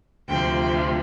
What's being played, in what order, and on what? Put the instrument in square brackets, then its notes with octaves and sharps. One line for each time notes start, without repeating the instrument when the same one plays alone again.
[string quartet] D2 C3 F3 G5